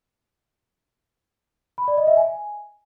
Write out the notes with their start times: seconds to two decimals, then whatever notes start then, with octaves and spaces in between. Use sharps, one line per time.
1.78 B5
1.88 D5
1.97 D#5
2.07 E5
2.17 G#5